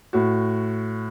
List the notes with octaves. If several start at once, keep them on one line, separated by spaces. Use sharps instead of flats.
A2 F#4